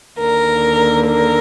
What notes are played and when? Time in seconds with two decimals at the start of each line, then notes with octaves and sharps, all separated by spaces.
0.19 D#2 D3 A#4
1.08 A#4